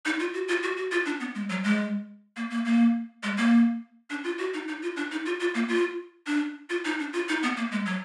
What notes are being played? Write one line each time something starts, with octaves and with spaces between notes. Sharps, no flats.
D#4
F4
F#4
F4
F#4
F#4
F4
D4
B3
G#3
F#3
G#3
A#3
A#3
A#3
G#3
A#3
D4
F4
F#4
D#4
D#4
F4
D4
D#4
F4
F4
A#3
F4
D4
F4
D#4
D4
F4
D#4
B3
A#3
G#3
F#3